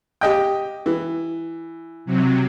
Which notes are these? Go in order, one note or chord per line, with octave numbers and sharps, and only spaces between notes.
G4 D#5 G5
E3
C3 F#3